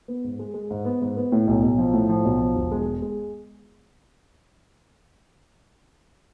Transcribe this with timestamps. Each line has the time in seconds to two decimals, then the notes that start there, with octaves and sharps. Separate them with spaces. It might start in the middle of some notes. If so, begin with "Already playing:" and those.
0.08 B3
0.24 G#2
0.39 G#3
0.54 G#3
0.71 G#2
0.85 B3
1.02 G#2
1.17 B3
1.32 A2
1.47 B1
1.63 B1
1.78 F3
1.93 A2
2.09 F3
2.25 B1
2.40 F3
2.56 E1
2.71 G#3
2.86 G#3
3.02 G#3